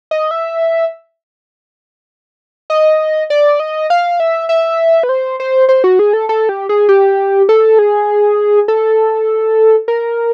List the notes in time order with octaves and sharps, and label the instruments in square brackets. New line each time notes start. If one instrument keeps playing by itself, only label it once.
[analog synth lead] D#5
E5
D#5
D5
D#5
F5
E5
E5
B4
C5
C5
C5
F#4
G#4
A4
A4
G4
G#4
G4
A4
G#4
A4
A#4